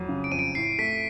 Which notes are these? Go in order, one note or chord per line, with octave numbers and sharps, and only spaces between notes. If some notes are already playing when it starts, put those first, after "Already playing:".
Already playing: F2 F#3
C#3
D7
F2 D#7
D7
A2 C7
A3 B6